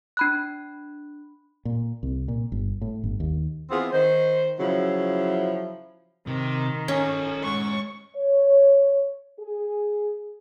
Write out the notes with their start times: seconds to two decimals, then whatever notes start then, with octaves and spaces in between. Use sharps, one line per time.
0.17 D4 B5 F#6
1.65 A#2
2.03 C2
2.28 A#2
2.52 G1
2.81 A2
3.04 G1
3.20 D#2
3.71 E3 B3 C4 F4 G#4
3.93 D#3 C5
4.60 C#3 F3 F#3 E4
6.27 C3 D#3
6.88 C#4 A4 G#5
7.44 G#3 F#5 C#6
8.16 C#5
9.39 G#4